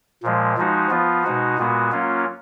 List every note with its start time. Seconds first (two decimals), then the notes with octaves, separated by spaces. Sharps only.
0.23 A#2 F3 G#3
0.57 F3 G#3 D#4 F#4
0.90 F3 B3 F4
1.23 B2 G#3 D#4 F#4
1.58 A#2 G#3 B3 F#4
1.92 F#3 A#3 C#4 F4